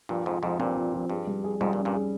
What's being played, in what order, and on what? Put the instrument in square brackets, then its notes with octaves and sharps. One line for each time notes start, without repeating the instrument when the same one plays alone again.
[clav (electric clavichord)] G2 A#2 [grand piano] F3
[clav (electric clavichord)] F2 G#2 [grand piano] F3
[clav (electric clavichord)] F2 G#2 [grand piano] F3
[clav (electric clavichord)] G2 A#2 [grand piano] C4
[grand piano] F3
F3
[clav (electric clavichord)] G2 [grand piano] G#4
[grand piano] G3
G#4
[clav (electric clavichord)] F2 G#2 [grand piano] G3
[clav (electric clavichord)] G2 A#2
[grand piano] C#4
[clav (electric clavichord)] G2 A#2
[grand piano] G#4